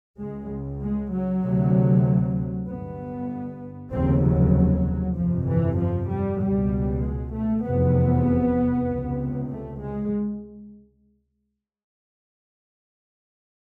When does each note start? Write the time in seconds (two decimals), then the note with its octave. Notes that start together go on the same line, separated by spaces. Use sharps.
0.19 C#2 C#3 G#3
0.82 G#3
1.13 F#3
1.43 D2 C3
2.67 G1 G2 B3
3.92 F1 D#2 C#3 C4
4.23 F#3
5.15 G1 F2 C3 F3
5.47 E3
5.79 F3
6.10 G3
6.40 C#2 B2 G3
7.03 G#3
7.34 A3
7.64 F1 E2 C3 B3
8.88 C#2 C3
9.51 A3
9.82 G#3